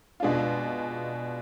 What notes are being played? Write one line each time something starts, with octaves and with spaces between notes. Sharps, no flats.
B2 G#3 D4 F4